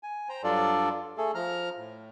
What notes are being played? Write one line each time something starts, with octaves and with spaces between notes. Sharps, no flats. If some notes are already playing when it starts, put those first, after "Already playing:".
G#5
C5 G5 A#5
G2 F#3 D4 F4 A4 D5
A3 G#4 A4
F3 A#5 F6
A2